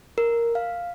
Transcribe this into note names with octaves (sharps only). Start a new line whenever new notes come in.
A#4
F5